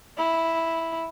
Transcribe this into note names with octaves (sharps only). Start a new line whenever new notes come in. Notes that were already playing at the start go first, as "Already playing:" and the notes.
E4